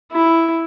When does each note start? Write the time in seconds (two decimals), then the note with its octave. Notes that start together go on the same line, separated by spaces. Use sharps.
0.12 E4